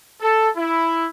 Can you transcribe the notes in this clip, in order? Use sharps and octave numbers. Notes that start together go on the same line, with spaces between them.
A4
E4